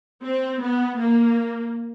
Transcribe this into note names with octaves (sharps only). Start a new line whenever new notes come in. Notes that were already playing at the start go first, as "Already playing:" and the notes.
C4
B3
A#3